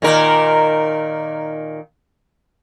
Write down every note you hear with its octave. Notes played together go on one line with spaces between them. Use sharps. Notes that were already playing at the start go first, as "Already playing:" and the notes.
A#2 D#3 A#4